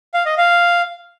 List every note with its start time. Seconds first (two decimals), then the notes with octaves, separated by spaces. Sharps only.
0.14 F5
0.26 D#5
0.38 F5